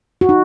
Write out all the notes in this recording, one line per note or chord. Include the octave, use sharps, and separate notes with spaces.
F#4
D#4